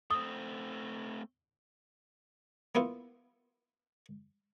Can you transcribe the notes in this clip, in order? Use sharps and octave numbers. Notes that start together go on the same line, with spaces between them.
A3 C4 D#6
A#3 B3 E4 F4